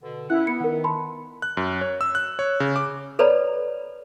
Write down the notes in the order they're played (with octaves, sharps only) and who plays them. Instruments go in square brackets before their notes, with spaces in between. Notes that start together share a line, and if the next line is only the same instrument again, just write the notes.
[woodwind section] B2 D3
[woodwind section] F#2 C#4 F#5 [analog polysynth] E4 [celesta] F#6
[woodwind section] B3 [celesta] C#7
[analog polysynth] D#3 [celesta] A#4 F#5
[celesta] A5 B5 C6
[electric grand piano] F#6
F#2
C#5
E6
F#6
C#5
C#3
D6
[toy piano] A4 B4 C#5 D5 A#5 B5